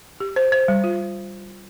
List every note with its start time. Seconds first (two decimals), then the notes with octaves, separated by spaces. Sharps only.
0.20 G4
0.36 C5
0.52 C5
0.68 G3
0.84 F4